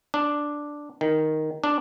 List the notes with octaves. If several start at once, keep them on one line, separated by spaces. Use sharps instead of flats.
D4
D#3
D4